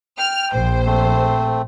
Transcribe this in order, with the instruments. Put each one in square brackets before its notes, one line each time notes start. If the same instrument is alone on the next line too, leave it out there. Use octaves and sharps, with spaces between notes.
[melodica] G5 [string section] F6
[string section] A#1 C5
[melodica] A3 C4